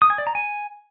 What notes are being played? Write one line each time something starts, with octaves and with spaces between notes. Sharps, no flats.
D#6
G#5
D5
A#5
G#5